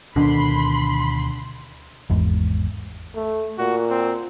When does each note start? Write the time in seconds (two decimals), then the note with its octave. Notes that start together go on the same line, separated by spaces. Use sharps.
0.16 D2 B2 D3 D#3 B5 C6
2.10 G#1 E2 G#2
3.15 A3
3.58 A#2 F#4
3.90 C4